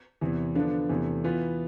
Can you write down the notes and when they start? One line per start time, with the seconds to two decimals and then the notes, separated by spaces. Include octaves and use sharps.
0.21 E2 C3 E3
0.55 D3 F3 B3 D4
0.89 E2 C3 E3 A3
1.24 E3 B3 F4